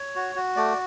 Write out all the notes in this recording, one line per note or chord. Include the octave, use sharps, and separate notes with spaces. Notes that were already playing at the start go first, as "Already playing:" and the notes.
Already playing: C#5
F#4
F#4
A3 D5